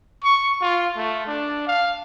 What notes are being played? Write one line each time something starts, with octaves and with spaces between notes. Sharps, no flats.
C#6
F4
A3
D4
F5